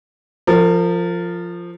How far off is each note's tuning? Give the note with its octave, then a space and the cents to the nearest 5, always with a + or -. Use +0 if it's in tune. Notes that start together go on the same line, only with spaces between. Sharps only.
F3 -5 A#4 -40